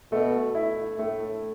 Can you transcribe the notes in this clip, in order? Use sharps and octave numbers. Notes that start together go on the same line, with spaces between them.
B2 A3
E4
A2 A3